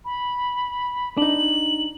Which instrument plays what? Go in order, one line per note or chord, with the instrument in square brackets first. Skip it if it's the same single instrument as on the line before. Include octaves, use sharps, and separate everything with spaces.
[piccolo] B5
[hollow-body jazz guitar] D4 D#4 [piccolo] F#7